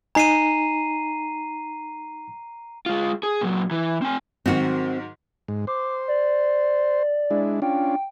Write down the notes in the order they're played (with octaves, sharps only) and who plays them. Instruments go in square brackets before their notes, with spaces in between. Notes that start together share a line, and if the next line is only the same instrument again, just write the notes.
[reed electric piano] D#4 G#5 [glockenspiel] A#5 C7 D#7
[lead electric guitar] G#3 F4
G#4
A#2 F#3
E3
C4 G#5
[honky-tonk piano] G#2 D#3 F#3 [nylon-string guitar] C4 F#4
[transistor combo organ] G#2
[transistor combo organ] C5 [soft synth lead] D6
[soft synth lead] D5
[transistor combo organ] G#3 D4 E4
[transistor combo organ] C#4 D4 F4 [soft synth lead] G5